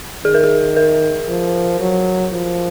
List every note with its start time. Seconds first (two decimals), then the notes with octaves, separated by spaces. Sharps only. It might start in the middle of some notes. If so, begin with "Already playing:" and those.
0.25 D#3 G#4
0.34 A#4
0.44 G#4
0.77 A#4
1.28 F3
1.80 F#3
2.32 F3